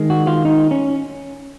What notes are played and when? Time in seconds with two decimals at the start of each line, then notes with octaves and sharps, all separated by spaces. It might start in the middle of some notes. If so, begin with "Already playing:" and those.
Already playing: D#3 G#3
0.10 F#4
0.27 F4
0.45 D#4
0.71 C#4